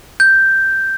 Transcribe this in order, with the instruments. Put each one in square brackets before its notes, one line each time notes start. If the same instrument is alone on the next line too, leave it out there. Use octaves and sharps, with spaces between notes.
[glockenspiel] G6